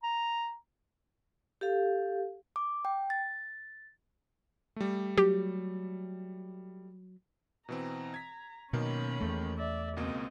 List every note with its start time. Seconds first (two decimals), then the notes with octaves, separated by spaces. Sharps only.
0.03 A#5
1.61 G4 A4 F5
2.56 D6
2.85 G5
3.10 A6
4.76 G3 A3
5.17 F#3 G4
7.69 B2 E3 C4 A#5
8.14 G#6 B6
8.73 F#2 B2 D#3 A#3 C#4 B5
9.21 E2 A3
9.57 D5 E5
9.97 C#2 B2 A#3 C4 D#5